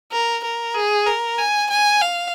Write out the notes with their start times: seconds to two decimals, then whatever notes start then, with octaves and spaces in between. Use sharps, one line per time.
0.12 A#4
0.44 A#4
0.75 G#4
1.07 A#4
1.38 G#5
1.70 G#5
2.01 F5